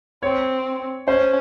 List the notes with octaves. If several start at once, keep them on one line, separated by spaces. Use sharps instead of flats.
C4 C#5
C#4 C5